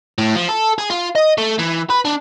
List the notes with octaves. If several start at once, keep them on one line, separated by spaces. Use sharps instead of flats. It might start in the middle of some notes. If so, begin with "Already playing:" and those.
A2
F3
A4
G#4
F4
D#5
A3
E3
B4
D4